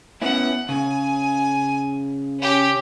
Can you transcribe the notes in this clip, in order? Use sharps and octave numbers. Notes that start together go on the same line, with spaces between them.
B3 C#4 E4 F#5
C#3 G#5
C#4 G4